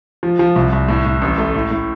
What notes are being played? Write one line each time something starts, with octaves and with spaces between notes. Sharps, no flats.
F3
F3
C2
C2
A2
A2
A1
A3
A2
A2